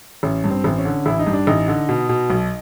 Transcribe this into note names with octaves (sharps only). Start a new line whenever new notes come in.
A1 C#4
G2
C4
A1
C#4
D3
A1 E4
D#4
G2
D4
A1 D#4
D3
B2
B2
B1